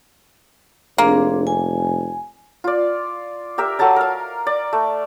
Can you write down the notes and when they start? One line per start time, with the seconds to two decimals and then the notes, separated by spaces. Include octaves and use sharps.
0.98 F1 A#3 C4 D4 G#4
1.47 G#5
2.64 F4 D5
3.58 G4 A#4 E5
3.79 F#3 A4 A5 A#5
3.96 A#4 F5
4.47 D5
4.73 A3